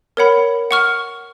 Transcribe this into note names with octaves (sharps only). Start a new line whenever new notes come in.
A#4 C#5 F#5 B5
F#5 C#6 F6